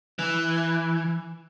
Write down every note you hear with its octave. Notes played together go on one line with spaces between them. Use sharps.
E3